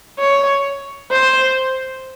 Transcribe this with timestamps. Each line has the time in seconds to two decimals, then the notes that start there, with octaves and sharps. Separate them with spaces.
0.20 C#5
1.11 C5